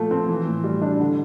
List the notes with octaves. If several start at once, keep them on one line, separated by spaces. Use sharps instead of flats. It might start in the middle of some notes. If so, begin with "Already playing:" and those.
Already playing: A#2 F3 A3
C4
E3
A2
G3
D4
D3